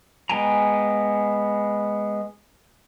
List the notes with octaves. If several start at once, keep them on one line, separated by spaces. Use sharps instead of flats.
G#3 B3 G5 G#5 A#5